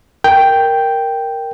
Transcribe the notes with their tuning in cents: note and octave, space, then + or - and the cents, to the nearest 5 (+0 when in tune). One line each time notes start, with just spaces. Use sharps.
A#4 +0 G5 +0